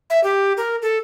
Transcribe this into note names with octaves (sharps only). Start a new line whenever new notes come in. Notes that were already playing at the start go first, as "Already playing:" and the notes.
E5
G4
A#4
A4